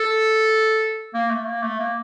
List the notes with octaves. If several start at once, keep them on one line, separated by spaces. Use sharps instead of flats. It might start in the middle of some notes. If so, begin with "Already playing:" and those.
Already playing: A4
A#3
A3
A#3
A3
A#3